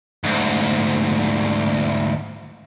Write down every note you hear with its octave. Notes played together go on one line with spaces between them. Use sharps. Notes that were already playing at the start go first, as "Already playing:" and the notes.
D2 G#2